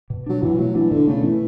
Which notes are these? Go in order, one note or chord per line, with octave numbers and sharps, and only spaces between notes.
B2
F#3 D4
B2 E3
F#3 A3
E3 D4
B2 D3
C#3 A3
B2 E3